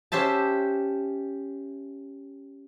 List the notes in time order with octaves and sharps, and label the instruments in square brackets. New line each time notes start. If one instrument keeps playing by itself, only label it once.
[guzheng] C#4 G4 C5 E5 A5